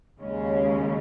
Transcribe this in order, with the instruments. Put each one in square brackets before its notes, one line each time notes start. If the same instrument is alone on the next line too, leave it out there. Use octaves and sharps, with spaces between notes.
[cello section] D#2 C#3 G#3 C#4